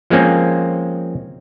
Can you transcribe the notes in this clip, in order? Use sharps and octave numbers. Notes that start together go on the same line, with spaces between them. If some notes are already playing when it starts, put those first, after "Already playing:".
F3 G#3 A#3 C4 C#4